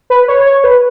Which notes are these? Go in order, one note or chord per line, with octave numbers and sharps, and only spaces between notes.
B4
C#5
C#5
B4